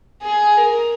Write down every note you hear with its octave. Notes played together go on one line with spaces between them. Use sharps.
G#4
A#4